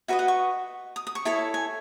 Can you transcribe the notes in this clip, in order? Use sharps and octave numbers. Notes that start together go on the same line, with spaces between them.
F#4 B4 D#5 E5
F#5
C#6
D#6
D#6
C#6
E4 A4 C#5 A5
G#5